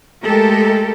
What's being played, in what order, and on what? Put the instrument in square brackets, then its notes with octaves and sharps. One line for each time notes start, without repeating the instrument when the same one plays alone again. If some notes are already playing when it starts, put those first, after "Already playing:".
[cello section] G#3 A3 G4 A4 A#4